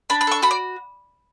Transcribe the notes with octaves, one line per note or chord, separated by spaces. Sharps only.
D4 B5
B5
A4 C#6
F#4 B5
D5